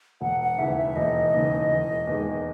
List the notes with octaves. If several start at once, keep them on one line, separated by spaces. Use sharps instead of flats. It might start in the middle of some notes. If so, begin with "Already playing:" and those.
E1 F#5
F#5
D#2 C#3 E3 E5
E5
E1 D#5
D#2 C#3 E3
E1
E2 D#3 G#3